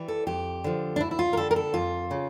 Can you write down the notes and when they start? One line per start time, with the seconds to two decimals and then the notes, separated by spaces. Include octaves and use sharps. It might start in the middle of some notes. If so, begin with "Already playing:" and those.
Already playing: E3 G3
0.08 A4
0.27 F2 G4
0.64 D3 F3
0.96 D4
1.00 D2 E4
1.11 E4
1.19 F4
1.33 A#4
1.37 D3 G3 A4
1.51 A#4
1.56 A4
1.74 F2 F4
2.11 C#3